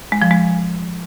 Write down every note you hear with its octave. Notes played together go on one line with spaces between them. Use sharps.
G#3
F3
G#3